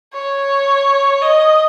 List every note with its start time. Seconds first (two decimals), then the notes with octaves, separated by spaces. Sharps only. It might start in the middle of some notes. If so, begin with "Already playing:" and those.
0.13 C#5
1.22 D#5